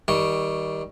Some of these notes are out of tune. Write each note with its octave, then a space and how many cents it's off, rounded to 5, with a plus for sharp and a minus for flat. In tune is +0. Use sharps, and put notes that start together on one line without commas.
D#3 +20 G3 +0 C#6 +0